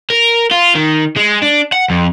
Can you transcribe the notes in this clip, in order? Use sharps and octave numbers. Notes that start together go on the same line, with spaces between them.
A#4
F4
D#3
G#3
D4
F#5
F2